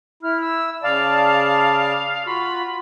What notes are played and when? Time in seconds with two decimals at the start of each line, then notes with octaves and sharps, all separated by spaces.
0.23 E4 F6
0.41 E6
0.83 C#3 D5 F5 A5
2.26 F4 F#4 B5